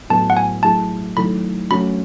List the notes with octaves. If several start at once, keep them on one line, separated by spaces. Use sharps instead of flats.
A2 F#3 B3 F#4 A4 A5
F#5
G#5
F#3 A3 E4 G#4 A5
D#3 F#3 A3 E4 A4 B5
F#3 A3 C#4 F#4 B5